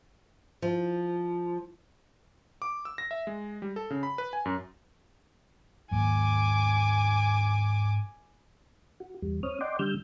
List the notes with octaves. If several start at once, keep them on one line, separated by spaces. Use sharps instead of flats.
F3
D6
E6
A#6
E5
G#3
G3
A4
C#3
B5
B4
G#5
F#2
D#2 G#2 F#3 G#5 D6
F#4
E2 G3
C4 C#5 D#6 F6
D5 D#5 F#5 G5 C6 D6
D3 G3 E6 F6 G6